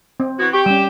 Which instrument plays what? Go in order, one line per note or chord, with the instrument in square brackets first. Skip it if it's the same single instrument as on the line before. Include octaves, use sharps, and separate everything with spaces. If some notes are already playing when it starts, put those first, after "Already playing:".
[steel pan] C4
[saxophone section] E3 B3 F#4 [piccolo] G#6
[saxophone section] G4 [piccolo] C#6
[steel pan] G3 C#4 [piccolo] E7